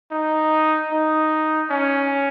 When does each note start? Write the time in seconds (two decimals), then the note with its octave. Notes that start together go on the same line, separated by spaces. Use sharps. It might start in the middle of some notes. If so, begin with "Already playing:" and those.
0.12 D#4
0.92 D#4
1.70 C#4